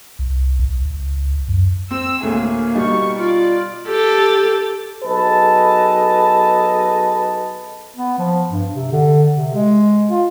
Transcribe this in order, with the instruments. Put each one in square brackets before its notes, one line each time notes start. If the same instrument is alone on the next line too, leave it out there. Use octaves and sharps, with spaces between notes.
[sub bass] C2
C2
C#2
F#2
[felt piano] C4 [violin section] E6
[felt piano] D2 A2 [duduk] A#3 [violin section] G#4
[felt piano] B2 G3 D#4 [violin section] C#6
[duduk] F4 [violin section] D5
[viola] G4 A4
[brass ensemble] B1 G#4 A4 B4 D#5 A5
[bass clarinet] B3
F3
G2
C3
D3
C3
G#3
F4